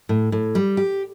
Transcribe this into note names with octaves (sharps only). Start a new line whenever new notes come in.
A2
A2
G3
G4